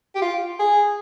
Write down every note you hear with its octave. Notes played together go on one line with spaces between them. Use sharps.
G4
F4
G#4